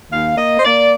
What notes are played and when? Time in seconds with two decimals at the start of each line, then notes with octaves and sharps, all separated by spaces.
0.10 D#2 F5
0.36 A#3 D#5
0.57 C5
0.64 A#3 D5